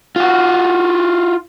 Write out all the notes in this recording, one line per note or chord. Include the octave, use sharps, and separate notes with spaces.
F4 F#4